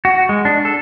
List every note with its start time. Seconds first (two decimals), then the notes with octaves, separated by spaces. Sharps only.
0.05 F#4
0.29 G#3
0.45 D4
0.65 A4